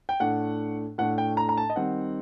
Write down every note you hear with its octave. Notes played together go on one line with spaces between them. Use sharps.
G5
A2 A3 D4 F#5
A2 A3 D4 F#5
G5
A#5
A#5
A5
D#5
D#3 G3 C4 D#4 F#5